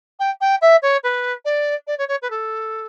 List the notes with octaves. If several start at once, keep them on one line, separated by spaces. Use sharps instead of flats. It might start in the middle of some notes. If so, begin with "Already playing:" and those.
G5
G5
E5
C#5
B4
D5
D5
C#5
C#5
B4
A4